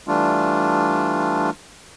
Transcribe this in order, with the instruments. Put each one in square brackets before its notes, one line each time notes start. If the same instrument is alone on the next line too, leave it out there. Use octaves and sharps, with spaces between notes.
[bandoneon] E3 G3 A3 D4 F4